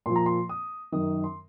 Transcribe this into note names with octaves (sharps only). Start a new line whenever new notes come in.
A#2 F3 C6
A#5
C6
D#6
F#2 D#3 D#6
C6